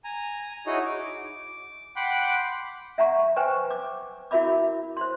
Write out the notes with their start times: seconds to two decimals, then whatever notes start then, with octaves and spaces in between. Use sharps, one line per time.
0.04 G#5 A#5
0.67 D#4 E4 F#4 G#4 C#5 D#5
0.86 D6
1.96 F#5 G5 B5 C6 D6 F#6
2.98 E5 F#5 A#5 C#6
3.36 B4 C5 G5 G#5 C#6
3.71 D6
4.31 E4 F#4 A#4 E5 B5 D6
4.97 C5 C6